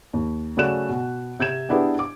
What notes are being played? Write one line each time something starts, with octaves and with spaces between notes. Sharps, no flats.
D#2
C#3 F#3 A3 D5 F#6 E7
B2
C3 G6 G#6 E7
B3 D4 E4 G4 G#4 B4
D6